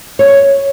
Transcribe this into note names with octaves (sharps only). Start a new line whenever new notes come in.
C#5